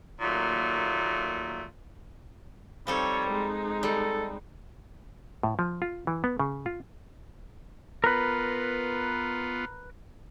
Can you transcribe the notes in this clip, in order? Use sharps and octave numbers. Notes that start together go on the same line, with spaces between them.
D#2 A#2 F#3 A3
F3 G3 C4 D#4 A4 C#5
G#3 D#4
G3 A4
A2
F3
F4
E3
B3
C#3
F4
B3 F4 A#4 B4